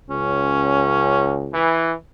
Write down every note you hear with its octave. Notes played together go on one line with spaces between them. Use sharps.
C#2 C#4
E3